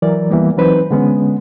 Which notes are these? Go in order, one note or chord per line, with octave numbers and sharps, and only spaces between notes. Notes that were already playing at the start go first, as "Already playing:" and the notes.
E3 F#3 A#4 D5
C2 E3 G3 A#3 B3
E3 F#3 C4 D#4 B4 C5
D3 G#3 B3 C#4